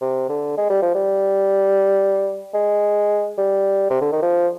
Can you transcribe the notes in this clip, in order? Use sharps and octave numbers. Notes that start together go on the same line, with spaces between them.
C3
D3
G#3
G3
F3
G3
G#3
G3
C3
D3
D#3
F3